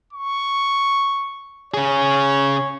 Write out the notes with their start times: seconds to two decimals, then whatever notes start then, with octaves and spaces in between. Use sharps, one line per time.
0.13 C#6
1.74 C#3 G#4 C#5